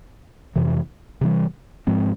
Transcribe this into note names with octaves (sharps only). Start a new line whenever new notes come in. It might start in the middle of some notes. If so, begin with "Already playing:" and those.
F2 C3 E3
C3 E3 G3
G#2 F3 G#3 C4